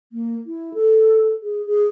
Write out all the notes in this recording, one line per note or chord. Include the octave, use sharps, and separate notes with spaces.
A#3
E4
A4
G#4
G#4